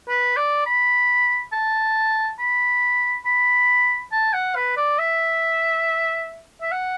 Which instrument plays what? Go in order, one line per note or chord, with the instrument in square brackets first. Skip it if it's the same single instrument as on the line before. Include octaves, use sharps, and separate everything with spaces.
[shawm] B4
D5
B5
A5
B5
B5
A5
F#5
B4
D5
E5
E5
F#5